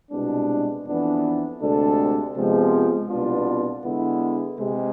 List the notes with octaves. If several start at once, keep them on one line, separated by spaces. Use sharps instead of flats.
C2 B2 G#3 D4
F2 E3 B3 D4
D2 C3 G#3 D4 A4
C3 F3 G#3 B3
C2 B2 B3 D4 F4
D3 G#3 B3 E4
C3 G#3